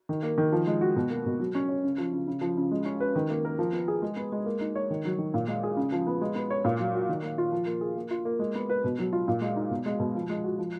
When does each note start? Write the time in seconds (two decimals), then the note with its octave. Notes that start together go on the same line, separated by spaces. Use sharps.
0.09 D#3
0.23 A#3
0.38 D#3
0.52 F3
0.67 G#3
0.81 F#4
0.96 B2
1.10 A#3
1.26 B2
1.39 F#3
1.55 C#4
1.69 C#5
1.84 C#3
1.98 F3
2.13 C#3
2.27 C#3
2.41 F3
2.57 C#3
2.71 G#3
2.85 C#4
3.00 B4
3.15 D#3
3.30 A#3
3.45 A#4
3.59 F3
3.73 B3
3.88 G#4
4.02 G#3
4.16 B3
4.32 G#3
4.46 A#3
4.60 D#4
4.75 C#5
4.90 D#3
5.05 F#3
5.18 D#3
5.34 A#2
5.48 G#3
5.63 G#4
5.77 C#3
5.92 F3
6.07 B3
6.21 G#3
6.35 B3
6.50 C#5
6.65 A#2
6.79 F#3
6.95 F#4
7.09 D#3
7.23 A#3
7.38 F4
7.52 F3
7.66 A#3
7.81 G#4
7.96 A#3
8.11 F4
8.25 A#3
8.39 G#3
8.55 B3
8.69 B4
8.84 B2
8.99 F#3
9.13 F4
9.28 A#2
9.41 G#3
9.56 D#4
9.71 B2
9.86 G#3
10.00 B2
10.15 F3
10.30 G#3
10.44 F#4
10.59 F3